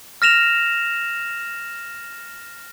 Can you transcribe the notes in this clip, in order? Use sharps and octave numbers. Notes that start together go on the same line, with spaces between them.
F6 A#6 E7 F7